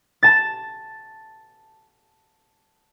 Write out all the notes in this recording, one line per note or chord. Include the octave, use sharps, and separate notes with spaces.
A5 A6